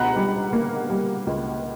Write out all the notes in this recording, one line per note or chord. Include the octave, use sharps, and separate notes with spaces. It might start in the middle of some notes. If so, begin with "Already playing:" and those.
Already playing: C#2 B2 F#5 A#5 B5
G3
A#3
G3
C#2